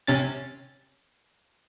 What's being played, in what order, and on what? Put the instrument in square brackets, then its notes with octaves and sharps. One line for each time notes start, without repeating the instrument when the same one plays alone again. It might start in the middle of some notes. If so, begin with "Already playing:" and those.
[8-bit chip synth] C3 C#4 A6